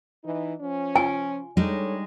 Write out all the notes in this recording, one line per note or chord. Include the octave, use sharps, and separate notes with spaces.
E3 D#4
F3 C#4
F4 G#5
G3 G#3 D4 D#4 A4 C#5